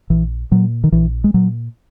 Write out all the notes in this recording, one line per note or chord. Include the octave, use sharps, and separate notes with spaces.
A#1 E3
A#2 F#3
D#3
A#1 E3
G#3
A#2 F#3